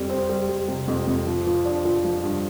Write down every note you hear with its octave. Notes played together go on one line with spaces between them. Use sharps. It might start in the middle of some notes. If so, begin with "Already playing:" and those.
Already playing: F2 G3
C4
G3
G3
C3
F2
F2
F3
F3
D4
F3
F3
G2